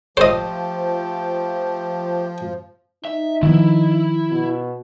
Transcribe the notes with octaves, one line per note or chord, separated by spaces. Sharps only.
F3 A3 G4 C5 D#5
D#4 E5
D#3 F3 B3 E4
B2